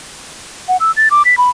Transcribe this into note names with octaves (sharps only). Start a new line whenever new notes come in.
F#5
E6
A6
D6
B6
B5